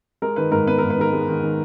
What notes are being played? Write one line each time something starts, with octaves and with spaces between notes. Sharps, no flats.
G#3 A#4
D#3 B4
G#2 A#4
B3 B4
G#2 A#4
B4
D#3 A#4
G#3
D#3
D#3